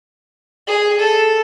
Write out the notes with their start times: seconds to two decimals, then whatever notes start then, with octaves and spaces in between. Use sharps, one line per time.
0.68 G#4
0.99 A4